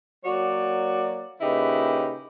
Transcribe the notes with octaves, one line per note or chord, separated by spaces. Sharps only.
F#3 A#3 F#4 C#5 D5
A#2 C#3 D#4 E4 G4 B4